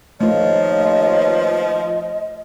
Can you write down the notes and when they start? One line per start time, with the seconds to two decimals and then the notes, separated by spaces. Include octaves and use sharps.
0.21 D#2 F3 A3 F4 B4 C#5 D#5